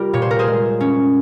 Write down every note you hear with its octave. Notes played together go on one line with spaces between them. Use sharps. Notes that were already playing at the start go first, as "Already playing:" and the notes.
Already playing: G3 F4 G4 A#4
A#2 C#5
C5
A#4
G#4 C5
G#3
C#4